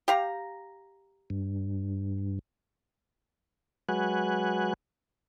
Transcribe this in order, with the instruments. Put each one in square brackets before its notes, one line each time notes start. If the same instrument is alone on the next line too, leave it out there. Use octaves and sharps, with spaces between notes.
[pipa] G4 F5 A#5
[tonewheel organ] G2
F#3 G#3 F#4 B4 G#5 F#6